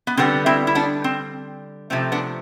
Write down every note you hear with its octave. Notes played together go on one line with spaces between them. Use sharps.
B3
D3 G3 B3 C4
C4 E4
E4
B3 D4
C4
C3 F3 A3 C4
B3 D4